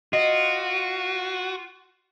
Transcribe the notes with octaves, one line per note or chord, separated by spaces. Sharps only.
F4 F#4 D#5